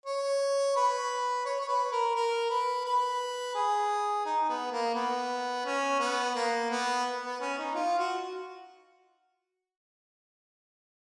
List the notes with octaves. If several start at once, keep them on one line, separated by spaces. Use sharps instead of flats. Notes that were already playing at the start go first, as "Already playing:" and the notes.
C#5
B4
C#5
C#5
B4
A#4
A#4
B4
B4
G#4
D#4
B3
A#3
B3
C#4
B3
A#3
B3
B3
C#4
D#4
F4
F#4